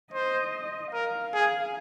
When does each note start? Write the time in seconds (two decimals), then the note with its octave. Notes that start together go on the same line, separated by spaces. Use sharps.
0.14 C5 D#5
0.93 A#4 F5
1.34 G#4